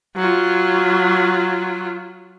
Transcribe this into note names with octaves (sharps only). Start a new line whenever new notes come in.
F#3 F4